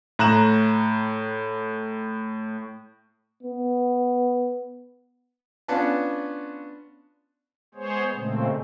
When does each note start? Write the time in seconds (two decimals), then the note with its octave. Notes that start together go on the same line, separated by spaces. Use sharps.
0.19 A2 A#5 F#6 E7
3.43 B3
5.68 B3 C#4 D4 F4 B4 A5
7.75 G#3 B3 G#4 C5 C#5
8.14 A#2 C#3 G#3 A3 C4